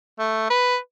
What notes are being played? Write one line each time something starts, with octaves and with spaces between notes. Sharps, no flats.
A3
B4